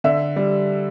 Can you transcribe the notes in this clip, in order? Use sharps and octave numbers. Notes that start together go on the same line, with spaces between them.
D3 E5
G3